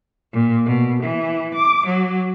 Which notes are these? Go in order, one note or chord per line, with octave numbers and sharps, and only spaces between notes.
A#2
B2
E3
D6
F#3